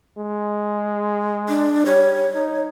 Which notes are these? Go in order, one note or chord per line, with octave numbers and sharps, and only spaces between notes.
G#3
D4
G3 C#5
D#4